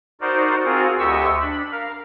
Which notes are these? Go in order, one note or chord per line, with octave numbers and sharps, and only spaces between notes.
D#4 F#4 A#4 C5 D5
C4 F4 F#4 G#4 A#4
D2 G4 D#5 C#6 E6
D4 B5
A#4 F5